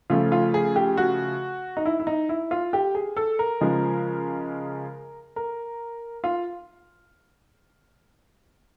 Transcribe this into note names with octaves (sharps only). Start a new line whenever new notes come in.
C#3 F3 A3 F4
F4
G#4
G4
F#4
D#4
E4
E4
D#4
E4
F4
G4
G#4
A4
A#4
C#3 F3 G#3
A#4
F4